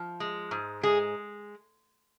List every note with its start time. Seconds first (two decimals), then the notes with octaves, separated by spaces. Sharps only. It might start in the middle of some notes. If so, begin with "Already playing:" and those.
Already playing: F3
0.20 G#3
0.51 G#2
0.83 G#3 G#4